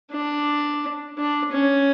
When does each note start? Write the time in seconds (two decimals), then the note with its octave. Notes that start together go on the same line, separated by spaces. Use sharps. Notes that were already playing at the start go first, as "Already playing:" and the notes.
0.12 D4
1.18 D4
1.53 C#4